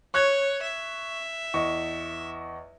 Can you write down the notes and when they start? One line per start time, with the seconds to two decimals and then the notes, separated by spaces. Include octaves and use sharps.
0.14 C#5 C#6 F#6 G#6
0.62 E5
1.54 E2 D#5 C#6